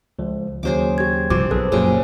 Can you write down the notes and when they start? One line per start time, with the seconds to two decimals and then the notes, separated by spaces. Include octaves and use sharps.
0.19 C#2 F3
0.63 D#2 C#3 F#3 G#4 C5 D6
0.98 G4 G#6
1.30 C2 G2 F3 C4 G4 D6
1.51 B1 G#4 A4 B4 C5
1.72 F#1 F#2 A#2 C#3 F3 F#3 G#4